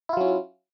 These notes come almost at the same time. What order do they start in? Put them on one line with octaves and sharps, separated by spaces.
E4 F4 F#3 C#4